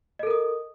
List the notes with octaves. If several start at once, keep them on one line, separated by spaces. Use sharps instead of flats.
A4 A#4 D#5 D#6